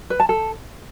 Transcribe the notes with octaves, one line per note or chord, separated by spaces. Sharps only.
B4
A5
A4